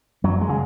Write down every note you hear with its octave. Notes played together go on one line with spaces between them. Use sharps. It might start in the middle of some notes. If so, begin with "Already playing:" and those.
F#2 F#3
G#3
C#3